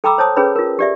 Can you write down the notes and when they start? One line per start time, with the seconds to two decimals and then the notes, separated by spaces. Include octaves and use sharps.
0.04 A4 G5 A#5 B5 D6 E6
0.18 C5 C#5 A5 D#6
0.36 C#4 G#4 B4 C#5 B5
0.56 F4 A#4
0.79 G4 D5 E5